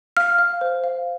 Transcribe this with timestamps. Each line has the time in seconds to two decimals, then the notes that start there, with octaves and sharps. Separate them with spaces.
0.17 F5 F6
0.39 F5
0.61 C5
0.84 F5